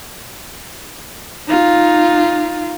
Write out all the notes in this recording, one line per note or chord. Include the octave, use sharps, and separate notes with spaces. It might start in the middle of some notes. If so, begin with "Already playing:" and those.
D#4 F4